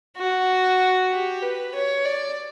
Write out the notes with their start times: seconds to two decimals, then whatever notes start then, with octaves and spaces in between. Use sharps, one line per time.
0.17 F#4
1.11 G4
1.42 B4
1.75 C#5
2.05 D5